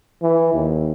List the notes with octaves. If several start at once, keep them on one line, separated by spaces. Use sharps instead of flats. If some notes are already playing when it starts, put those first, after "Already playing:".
E3
D#2